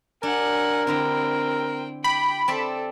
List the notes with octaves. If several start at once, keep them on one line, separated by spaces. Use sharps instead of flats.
D4 A#4 F#5 G#5
D3 C4 E4 G5 A#5
G4 G5 B5
C4 A4 D5 E5